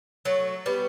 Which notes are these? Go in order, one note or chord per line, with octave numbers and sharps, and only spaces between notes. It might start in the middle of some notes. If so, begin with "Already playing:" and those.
F#3 A3
G3 B3